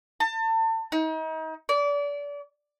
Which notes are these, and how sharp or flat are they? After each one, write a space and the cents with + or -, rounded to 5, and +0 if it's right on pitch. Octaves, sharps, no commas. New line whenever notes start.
A5 +35
D#4 +35
D5 -30